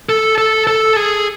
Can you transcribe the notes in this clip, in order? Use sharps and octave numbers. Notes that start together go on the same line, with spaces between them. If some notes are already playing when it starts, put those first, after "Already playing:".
A4
A4
A4
G#4